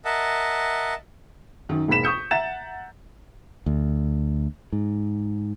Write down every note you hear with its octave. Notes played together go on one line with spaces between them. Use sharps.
A#4 D#5 E5 F#5 A5
F#2 D#3
E1 G#2 A#3 B5 B6 E7
C#6 D#6 G6 C#7
E5 F#5 A#5 A6 E7
D2
G#2